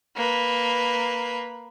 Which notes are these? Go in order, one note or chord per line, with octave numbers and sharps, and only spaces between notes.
A#3 B4